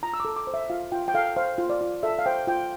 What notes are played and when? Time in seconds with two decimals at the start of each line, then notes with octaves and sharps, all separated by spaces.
0.03 F4 A#5
0.14 E6
0.20 A4 D6
0.36 D6
0.47 C5
0.54 E5
0.70 F4 F5
0.92 F4 G5
1.08 G5
1.14 A4 F5
1.36 C5 F5
1.58 F4
1.70 D5
1.81 F4
2.03 A4 E5
2.19 F5
2.26 C5 G5
2.47 F4 G5